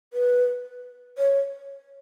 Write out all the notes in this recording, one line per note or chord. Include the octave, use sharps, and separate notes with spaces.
B4
C#5